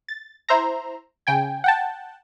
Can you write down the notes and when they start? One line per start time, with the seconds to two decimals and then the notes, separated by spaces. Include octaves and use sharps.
0.08 A6
0.49 E4 C5 E5 A#5
1.27 C#3 G5 G#5
1.64 F#5 G5 A5